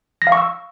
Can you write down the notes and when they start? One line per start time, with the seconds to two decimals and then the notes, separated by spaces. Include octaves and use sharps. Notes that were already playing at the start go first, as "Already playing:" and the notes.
0.22 A#6
0.27 F5
0.32 C#6
0.37 E6